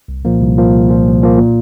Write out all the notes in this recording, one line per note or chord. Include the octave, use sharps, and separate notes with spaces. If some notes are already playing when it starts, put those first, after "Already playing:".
C2
A#2 F3 A#3
C2
A#2 F3 A#3
C2
A#2 F3 A#3
C2
A#2 F3 A#3
A#2